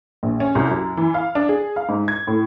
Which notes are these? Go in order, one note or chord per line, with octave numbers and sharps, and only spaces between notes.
A#1
C#4
C2
F#2
E3
F5
D4
G#4
F5
G#2
G#6
A2